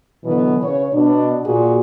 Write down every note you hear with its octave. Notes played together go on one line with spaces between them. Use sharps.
B2 D3 E3 F#3 B3
C#3 B4 C#5
B2 D4
A#2 F4 F#4 G#4